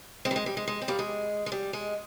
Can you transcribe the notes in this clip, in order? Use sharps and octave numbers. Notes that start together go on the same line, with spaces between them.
G#3 C4
G3
G#3
G3
G#3
G#3
C4
G3 A#3
G#3
G#3
G3
G#3